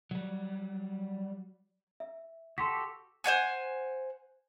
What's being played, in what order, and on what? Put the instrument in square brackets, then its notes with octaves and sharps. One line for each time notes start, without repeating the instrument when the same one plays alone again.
[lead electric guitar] F#3 G3
[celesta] E5
[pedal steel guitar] F#4 G4 A4 [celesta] C6 B6
[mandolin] C5 C#5 F#5 G#5